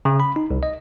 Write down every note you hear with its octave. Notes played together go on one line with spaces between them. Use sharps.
C#3
B5
D#4
C2
D#5